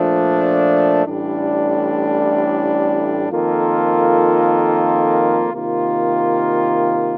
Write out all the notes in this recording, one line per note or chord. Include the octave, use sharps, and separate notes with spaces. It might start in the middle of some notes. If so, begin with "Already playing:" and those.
Already playing: A#2 F3 A3 D4
A1 A2 G3 D4
F2 D#3 A#3 F4 A4
C3 D#3 A#3 F4